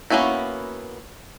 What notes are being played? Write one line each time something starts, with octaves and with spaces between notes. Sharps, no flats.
A#3 B3 C#4 E4 F#4